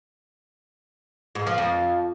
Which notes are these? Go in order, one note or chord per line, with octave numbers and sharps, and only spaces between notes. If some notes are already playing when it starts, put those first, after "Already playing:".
G#2
F3
F2